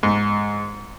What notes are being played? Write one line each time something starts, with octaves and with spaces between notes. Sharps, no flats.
G#2